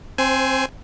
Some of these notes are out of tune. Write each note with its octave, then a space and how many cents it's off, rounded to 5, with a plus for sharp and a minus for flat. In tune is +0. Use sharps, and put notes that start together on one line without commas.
C4 +20 C5 -10 G#5 +10